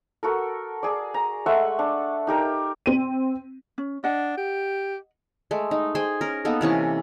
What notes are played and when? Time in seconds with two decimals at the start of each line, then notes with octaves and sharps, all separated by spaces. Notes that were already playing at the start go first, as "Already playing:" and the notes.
0.23 F#4 A4 A#4
0.83 G#4 D5
1.14 A#5
1.46 G#3 A3 E5 F#5
1.79 D4
2.27 D#4 G4 A#4
2.86 C4 D#7
3.78 C#4
4.04 D4 D#5 F#5
4.38 G4
5.51 G#3 A3
5.71 D#4
5.95 G#4 C5 G5 G#5
6.21 C#4 A#4
6.45 A#3 B3 D#4 A4
6.61 C3 E3 C#4 C#6